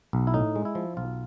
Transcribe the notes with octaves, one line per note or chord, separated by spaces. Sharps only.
B1
E4
A2 D#4
G#3
E4
F3
B1 F4